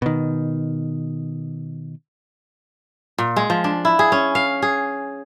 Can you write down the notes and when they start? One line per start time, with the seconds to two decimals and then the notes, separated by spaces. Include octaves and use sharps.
0.02 B2 D#3
3.18 A#2
3.36 G#3
3.50 F3
3.64 D4
3.85 E4
3.99 G#4
4.12 C#4
4.35 F5
4.62 G#4